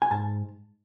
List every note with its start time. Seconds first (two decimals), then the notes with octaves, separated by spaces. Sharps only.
0.02 G#5
0.11 G#2 A5